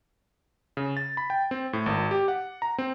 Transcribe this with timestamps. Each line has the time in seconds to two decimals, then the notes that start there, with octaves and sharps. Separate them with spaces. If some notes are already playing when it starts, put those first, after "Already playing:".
0.77 C#3
0.97 A6
1.17 B5
1.30 G5
1.51 C4
1.73 A2
1.86 G#1
2.11 G4
2.28 F#5
2.62 A#5
2.78 C4